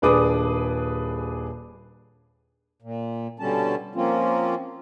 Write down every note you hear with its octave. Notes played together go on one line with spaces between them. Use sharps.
D#1 D4 G#4 B4 D6 D#6
A#2
B2 D3 G3 C#4 A5
F3 A#3 C4 C#4 F4